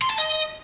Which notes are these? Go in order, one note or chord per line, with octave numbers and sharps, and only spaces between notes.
C6
A5
D#5